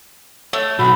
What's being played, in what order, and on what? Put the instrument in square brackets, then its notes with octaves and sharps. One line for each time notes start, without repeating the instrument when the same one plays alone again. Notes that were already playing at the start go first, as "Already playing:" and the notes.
[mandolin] A3 [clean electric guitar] C#5
[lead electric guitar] B1 [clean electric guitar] F#4 [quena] B5